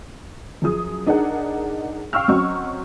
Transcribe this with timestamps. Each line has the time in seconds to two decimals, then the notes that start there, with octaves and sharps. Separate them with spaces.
0.62 F#2 F3 G#4 D#6
1.06 D4 D#4 G#4 A#4 F#5
2.13 F5 G5 C#6 E6 F6
2.28 F#3 C4 C#4 F#4 D#5 C#6